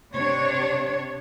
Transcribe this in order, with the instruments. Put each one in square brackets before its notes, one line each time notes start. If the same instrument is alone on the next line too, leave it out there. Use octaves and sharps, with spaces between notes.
[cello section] C3 D4 C#5